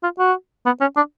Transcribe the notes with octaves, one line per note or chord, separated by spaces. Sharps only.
F4
F#4
B3
C#4
D4